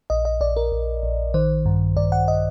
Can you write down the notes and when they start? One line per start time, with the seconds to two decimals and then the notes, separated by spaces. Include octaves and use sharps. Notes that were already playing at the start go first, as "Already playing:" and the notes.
0.10 A#1 D#5
0.25 D#5
0.41 A#1 D5
0.56 A#4
0.72 A#1
1.03 A#1
1.34 D#3 C5
1.65 G2
1.96 G2 D5
2.12 F#5
2.28 D#5